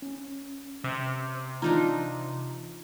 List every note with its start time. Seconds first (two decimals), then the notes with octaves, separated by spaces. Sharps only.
0.02 C#4
0.84 C3
1.62 E3 D4 D#4 F4 A#5